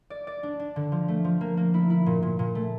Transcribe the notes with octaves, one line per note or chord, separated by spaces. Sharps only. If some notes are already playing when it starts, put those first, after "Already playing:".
D5
D5
D4
D4
D3
F3
A3
F3
A#3
A#3
E4
E4
A#2
A#2
A#2
A3